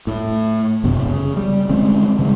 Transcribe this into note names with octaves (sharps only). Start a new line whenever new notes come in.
A2
G1 F#2 C3 B3
C#3
G3
D3 G#3 C4 C#4
C#3 G3 G#3